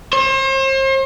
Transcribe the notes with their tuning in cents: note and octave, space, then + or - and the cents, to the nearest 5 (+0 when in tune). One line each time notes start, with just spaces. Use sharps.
C5 +40